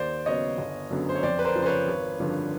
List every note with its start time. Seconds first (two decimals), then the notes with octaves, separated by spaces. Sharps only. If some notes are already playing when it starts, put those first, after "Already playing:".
Already playing: D#2 C5 D5
0.26 C#3 F#3 B3 C#5 D#5
0.58 G1
0.90 F#2 D3 F#3 B3
1.09 C5
1.15 C#5
1.23 F2 C5 D5
1.39 B4
1.44 A#4 C5
1.56 C#3 F3
1.62 C5
1.66 B4 C#5
1.88 G#1
2.20 G2 D3 F3